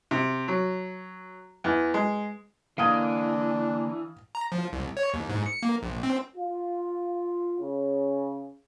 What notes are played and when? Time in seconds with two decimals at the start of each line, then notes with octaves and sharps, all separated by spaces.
0.11 C3
0.48 F#3
1.64 E2
1.94 G#3
2.78 D3 E3 A#3 D4 D#5 F5 D#6 G#6
4.35 A#5
4.52 F3
4.73 C2
4.97 C#5
5.14 D#2
5.29 G#2
5.46 C#7
5.63 A#3
5.82 A#1
6.03 C4
6.37 F4
7.60 C#3